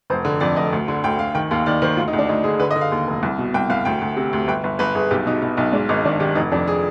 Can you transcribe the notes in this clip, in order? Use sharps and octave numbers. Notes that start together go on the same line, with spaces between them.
F1 C5
D3
F2 D5
F1 D#5
D2
D3
D2 G5
D2 F5
D#3 G5
D#2 F5
D#3 D5
D#3 C5
D2 F4
D#4
D2
D4
D2 D#4
D3 G#4
D3 B4
D#5
D3
F5
D#2
F1
C2
B2
C2 G5
C2 F5
D2 G5
D2
C3
D2
G1 G5
G1
G1 B4
G1 G#4
B1 G4
B2 D#4
B2 D#4
B1 D#4
G#2 D4
G#1 D#4
D#3 D4
D#3 G4
F1 D#4
F2 D4
G#4